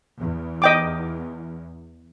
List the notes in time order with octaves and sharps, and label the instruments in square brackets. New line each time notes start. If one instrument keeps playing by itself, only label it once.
[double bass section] E2
[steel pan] D#5 G5 D6